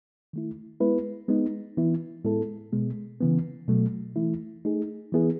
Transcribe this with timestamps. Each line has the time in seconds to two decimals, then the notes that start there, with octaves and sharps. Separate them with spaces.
0.33 D#3 A3 E4
0.81 G#3 B3 E4 B4
1.29 G#3 B3 D#4
1.77 E3 B3 E4
2.24 A2 G#3 B3 E4 A4
2.72 B2 G#3 B3
3.21 C#3 E3 B3
3.68 B2 F#3 A3
4.16 E3 A3 E4
4.65 A3 D#4 G#4
5.12 E3 B3 E4 G#4